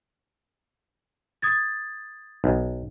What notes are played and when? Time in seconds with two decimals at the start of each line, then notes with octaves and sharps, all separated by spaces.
1.42 D#6 G#6 A6
2.44 B1